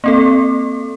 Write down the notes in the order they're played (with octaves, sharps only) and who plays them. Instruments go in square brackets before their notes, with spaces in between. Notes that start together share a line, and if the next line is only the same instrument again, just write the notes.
[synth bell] A#3 C4 A4